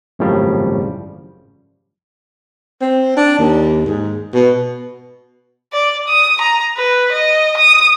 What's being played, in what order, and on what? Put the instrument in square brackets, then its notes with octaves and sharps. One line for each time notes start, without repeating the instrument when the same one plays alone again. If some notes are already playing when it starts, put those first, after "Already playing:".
[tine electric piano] G#1 F#2 A2 C#3 F3 G3
[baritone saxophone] C4
D4
D#2
G#2
B2
[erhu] D5
D#6
A#5
B4
D#5
D#6